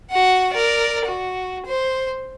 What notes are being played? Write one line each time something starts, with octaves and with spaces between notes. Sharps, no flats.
F#4 F#5
A#4 D5
F#4
C5